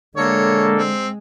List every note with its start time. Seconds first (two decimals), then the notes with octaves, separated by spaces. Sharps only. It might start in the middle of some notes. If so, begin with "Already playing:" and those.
0.17 D3 G#3 A#3 A4 C#5
0.77 C4